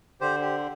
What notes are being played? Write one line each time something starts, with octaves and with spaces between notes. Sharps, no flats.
D3 G4 C5
G4